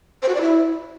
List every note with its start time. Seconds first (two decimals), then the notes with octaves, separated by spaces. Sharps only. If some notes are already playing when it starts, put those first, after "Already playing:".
0.22 C5
0.29 F#4
0.35 D5
0.41 E4